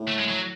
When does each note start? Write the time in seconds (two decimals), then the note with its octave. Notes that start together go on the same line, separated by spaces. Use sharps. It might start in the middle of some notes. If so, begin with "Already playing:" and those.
Already playing: A2
0.08 A3
0.19 G#3
0.28 F#3